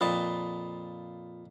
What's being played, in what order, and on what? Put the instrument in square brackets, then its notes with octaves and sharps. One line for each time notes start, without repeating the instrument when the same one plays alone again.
[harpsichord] F2 A#2 A5 [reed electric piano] F4 B5 D#6